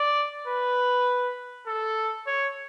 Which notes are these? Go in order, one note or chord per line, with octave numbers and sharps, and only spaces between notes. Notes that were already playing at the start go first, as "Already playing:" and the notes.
Already playing: D5
B4
A4
C#5